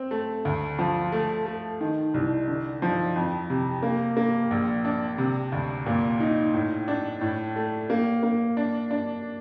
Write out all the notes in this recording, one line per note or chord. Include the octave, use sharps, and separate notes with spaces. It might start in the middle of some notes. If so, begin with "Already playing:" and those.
Already playing: C4
A3
D2
F3
A3
A3
D#3
C2
D3
F3
F2
C3
A#3
A#3
A#1
D4
C3
D2
A#2
D#4
A2
D4
A2
A3
A#3
A#3
D4
D4